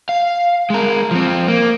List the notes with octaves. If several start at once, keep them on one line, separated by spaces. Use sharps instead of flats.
F5
G#3 A#4
F3 C4
A#3